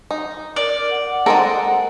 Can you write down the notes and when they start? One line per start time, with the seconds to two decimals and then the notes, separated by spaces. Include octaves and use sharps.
0.11 D#4
0.56 A#4 D5
0.91 F#5
1.26 G#3 C4 A4 A#4